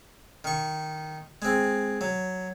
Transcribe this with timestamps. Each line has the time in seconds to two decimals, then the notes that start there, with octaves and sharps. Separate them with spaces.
0.44 D#3 C#6
1.42 G#3 C4
2.01 F#3